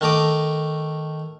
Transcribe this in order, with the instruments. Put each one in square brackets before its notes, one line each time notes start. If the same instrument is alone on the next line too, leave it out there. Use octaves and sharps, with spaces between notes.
[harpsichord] D#3 A3 A#5 D6 D#6